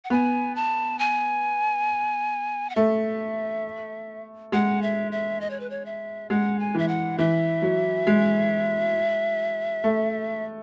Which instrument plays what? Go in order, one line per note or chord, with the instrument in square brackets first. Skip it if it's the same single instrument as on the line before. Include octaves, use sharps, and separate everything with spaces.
[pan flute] F#5
[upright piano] B3 [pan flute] G#5
[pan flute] A5
G#5
F#5
[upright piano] A3 [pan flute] E5
[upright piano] G#3 [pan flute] F#5
[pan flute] E5
E5
D#5
C#5
B4
C#5
E5
[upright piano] G#3 [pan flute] F#5
[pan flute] G#5
[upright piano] E3 [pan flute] E5
[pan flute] F#5
[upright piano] E3 [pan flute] E5
[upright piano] F#3
G#3
A3